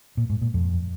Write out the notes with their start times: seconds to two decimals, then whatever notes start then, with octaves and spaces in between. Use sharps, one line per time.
0.17 A#2
0.30 G#2
0.41 A#2
0.54 F2